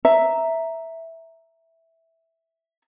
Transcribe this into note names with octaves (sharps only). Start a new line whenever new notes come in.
E5 A#5